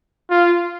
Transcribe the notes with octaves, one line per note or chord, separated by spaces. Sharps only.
F4